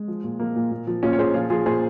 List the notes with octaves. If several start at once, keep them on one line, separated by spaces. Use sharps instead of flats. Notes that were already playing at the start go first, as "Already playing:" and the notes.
Already playing: G#3
F3
A#2
F3 A#3
A#2
A#2
F3
A#2 C#4 F4
C#5
A#2 G#4 C5
F3 F4 G#4
F3 F4 G#4
A#2 G#4 C5